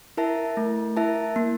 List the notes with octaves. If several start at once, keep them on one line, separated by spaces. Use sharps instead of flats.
E4 A#4 E5 A5
A3
E4 A#4 E5 A5
A#3